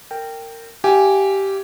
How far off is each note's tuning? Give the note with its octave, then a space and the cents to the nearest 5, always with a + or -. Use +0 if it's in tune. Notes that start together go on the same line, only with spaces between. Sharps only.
A#4 -25 G5 +0
G4 -10 F5 -40 G#5 +0